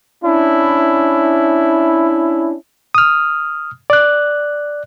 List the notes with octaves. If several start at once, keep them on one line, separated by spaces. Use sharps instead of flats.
C#4 D4 E4
D#6 F6
D5 F#6